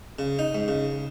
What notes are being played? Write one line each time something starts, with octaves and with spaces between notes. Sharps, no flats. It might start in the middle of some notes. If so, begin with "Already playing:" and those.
C#3
D#4
G#2
C#3